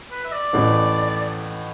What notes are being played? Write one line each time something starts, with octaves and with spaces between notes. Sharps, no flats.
B4
E5
D5
A1 A2 E3